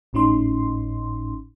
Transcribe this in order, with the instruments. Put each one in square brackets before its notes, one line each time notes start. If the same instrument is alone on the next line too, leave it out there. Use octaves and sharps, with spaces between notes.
[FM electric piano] G#1 A2 C#4 D#4 C6